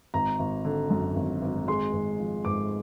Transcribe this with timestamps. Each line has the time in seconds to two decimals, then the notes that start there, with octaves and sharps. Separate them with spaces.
0.14 G#1 A#5
0.39 G#1
0.65 D3
0.90 F#2
1.16 G#1
1.41 G#1
1.68 G#3 C6
1.93 G#1
2.19 F3
2.45 G#2 D6